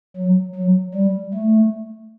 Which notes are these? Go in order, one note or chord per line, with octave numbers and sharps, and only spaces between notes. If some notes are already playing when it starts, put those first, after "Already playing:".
F#3
F#3
G3
A3